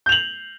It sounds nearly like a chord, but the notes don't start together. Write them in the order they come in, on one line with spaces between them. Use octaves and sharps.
G6 F7 F#7